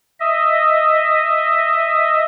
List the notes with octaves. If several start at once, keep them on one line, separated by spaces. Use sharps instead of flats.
D#5 E5